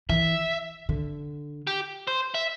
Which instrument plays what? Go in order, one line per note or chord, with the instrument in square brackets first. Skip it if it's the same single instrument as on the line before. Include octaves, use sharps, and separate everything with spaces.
[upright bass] E3 [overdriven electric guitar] E5
[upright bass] D3
[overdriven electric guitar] G4
C5
E5